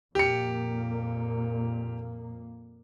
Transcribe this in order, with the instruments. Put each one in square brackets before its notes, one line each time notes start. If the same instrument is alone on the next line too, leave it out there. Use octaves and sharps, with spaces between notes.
[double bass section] F2 A#2 A#3 [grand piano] G4 C#7